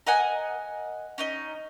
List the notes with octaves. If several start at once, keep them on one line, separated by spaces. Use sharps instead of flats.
A#4 D#5 F#5 G#5
C#4 D#4 D#5